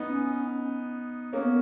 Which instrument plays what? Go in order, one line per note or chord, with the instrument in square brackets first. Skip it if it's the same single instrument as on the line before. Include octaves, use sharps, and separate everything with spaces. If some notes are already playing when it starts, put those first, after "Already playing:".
Already playing: [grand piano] B3 D#4
[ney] C#4
[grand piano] A#3 C#4 [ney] B3